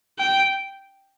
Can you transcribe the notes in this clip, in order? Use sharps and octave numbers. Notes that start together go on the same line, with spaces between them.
G5